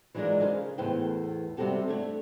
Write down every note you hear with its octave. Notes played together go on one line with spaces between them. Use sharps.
E3 F#3 G#3 D4 F4 A#4
C#3 G#4 A#4 C5 F5
E2 A2 B4 C5 G5
C3 G3 C4 F#4 G4 A4
A3 D4 C#5